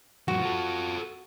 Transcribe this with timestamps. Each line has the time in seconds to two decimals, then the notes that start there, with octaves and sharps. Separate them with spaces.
0.28 G2 F3 F#4
0.42 F4 A4